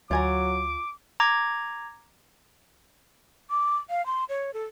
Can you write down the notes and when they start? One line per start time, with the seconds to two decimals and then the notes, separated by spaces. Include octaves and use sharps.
0.11 D2 F#3 F4 G#5 A#5 D6
1.20 A#5 D6 G#6
3.50 D6
3.89 F5
4.06 C6
4.29 C#5
4.54 A4